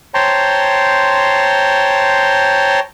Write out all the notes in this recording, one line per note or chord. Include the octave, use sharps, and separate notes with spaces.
C5 C#5 G5 A5 A#5 C6